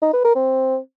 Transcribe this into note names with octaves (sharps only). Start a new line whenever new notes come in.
D#4
B4
A#4
C4